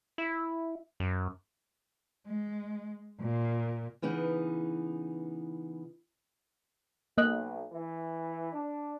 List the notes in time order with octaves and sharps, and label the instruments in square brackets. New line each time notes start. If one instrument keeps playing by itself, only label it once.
[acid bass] E4
F#2
[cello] G#3
A#2
[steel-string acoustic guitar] C#3 E3 B3 D#4
[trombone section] B1 [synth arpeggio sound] A#3 D#5 F#6
[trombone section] E3
D4